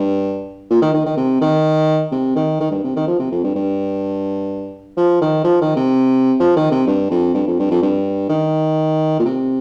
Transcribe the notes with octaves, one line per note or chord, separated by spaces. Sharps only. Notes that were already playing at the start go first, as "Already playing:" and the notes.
Already playing: G2
A#2
D#3
D#3
D#3
C3
D#3
C3
D#3
D#3
G2
C3
D#3
F3
C3
F2
G2
G2
F3
D#3
F3
D#3
C3
F3
D#3
C3
G2
F2
G2
F2
G2
F2
G2
D#3
A#2
C3